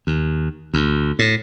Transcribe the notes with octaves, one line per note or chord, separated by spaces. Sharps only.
D#2
D2
A2